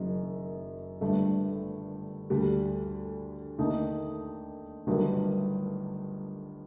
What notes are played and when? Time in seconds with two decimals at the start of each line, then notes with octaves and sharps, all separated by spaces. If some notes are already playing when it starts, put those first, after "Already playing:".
Already playing: F#1 F#2 D#3
1.01 G1 G2 D3 A3
2.30 D2 D3 G3
3.58 D#2 D3 A3 D#4 A4
4.87 G1 G2 D#3 F#3 A3